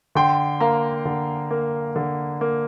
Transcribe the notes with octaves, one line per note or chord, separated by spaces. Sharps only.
D3 G5 C6
A#3 F5 A#5
D3
A#3
D3
A#3